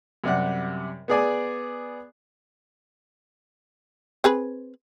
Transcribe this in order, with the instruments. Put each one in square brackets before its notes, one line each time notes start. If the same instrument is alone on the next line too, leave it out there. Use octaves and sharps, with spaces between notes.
[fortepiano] F#2 C3 G3 D5 F#5
B3 G#4 D5 G#5
[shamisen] C4 G#4 B4